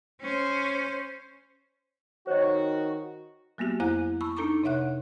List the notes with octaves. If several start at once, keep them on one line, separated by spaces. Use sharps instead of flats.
C#4 C5
D#3 F#4 C5 C#5 D#5
F#3 A#3 B3 F#4 G4
F2 E4 C5 G#5 A#5 F#6
A5 B5 C#6 E6
D4 D#4 A4 A#5 C#6 D6
C3 C#5 E5 F#5 F#6